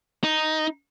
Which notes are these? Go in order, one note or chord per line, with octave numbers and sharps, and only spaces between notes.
D#4